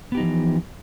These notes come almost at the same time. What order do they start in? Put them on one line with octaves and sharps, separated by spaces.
B3 G4 D#4 F3 E3